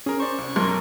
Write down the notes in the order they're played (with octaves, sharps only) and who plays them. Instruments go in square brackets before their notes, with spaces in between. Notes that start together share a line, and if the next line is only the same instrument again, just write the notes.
[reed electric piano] C#4 [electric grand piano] G#4 A#4
[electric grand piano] C5 D5 [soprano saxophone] C#6
[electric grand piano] C2
[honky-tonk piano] B1 [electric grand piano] F#2 A#4 C6